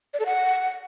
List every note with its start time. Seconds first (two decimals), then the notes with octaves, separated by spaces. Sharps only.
0.14 D5
0.20 A4
0.26 F#5